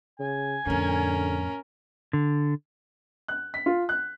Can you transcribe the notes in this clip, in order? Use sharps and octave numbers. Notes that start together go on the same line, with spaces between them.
C#3 G#5
F2 A2 D3 C#4 A#4
D3
F#6
B6
F4
F#6